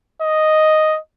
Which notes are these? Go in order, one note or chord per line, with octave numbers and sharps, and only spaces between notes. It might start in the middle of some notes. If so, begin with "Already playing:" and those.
D#5